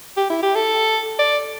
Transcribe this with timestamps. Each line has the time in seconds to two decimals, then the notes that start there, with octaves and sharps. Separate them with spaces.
0.17 G4
0.30 E4
0.43 G4
0.55 A4
1.19 D5